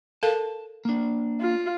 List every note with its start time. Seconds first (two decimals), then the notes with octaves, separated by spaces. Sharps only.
0.23 A4 A#4 F5 A5
0.85 A#3 D4
1.41 F4